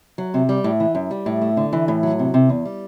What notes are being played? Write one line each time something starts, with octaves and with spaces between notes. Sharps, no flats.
F#3
C3
G3
A2
E3
F#2
G3
A2
A3
D3
E3
A2
F#3
C3
C3
E2
G3